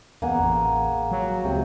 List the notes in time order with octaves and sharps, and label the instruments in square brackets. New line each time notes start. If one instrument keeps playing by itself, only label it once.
[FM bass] E2 [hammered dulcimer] A#3 G#4 F#5
[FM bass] A1
F#3
[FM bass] C#2 [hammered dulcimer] C3